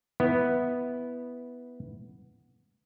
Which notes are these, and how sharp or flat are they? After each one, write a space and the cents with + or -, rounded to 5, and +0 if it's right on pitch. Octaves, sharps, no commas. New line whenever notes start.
B3 +0 E4 -10